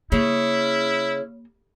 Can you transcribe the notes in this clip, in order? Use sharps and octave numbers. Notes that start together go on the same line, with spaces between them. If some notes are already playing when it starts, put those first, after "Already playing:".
C#3 A#3 E4